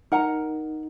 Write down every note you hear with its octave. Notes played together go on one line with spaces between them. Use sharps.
D#4 A#4 F#5 A#5